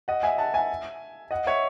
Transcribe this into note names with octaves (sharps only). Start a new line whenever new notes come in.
D#5 F#5
E5 G#5
F#5 A5
E5 G#5
D#5 F#5
C#5 E5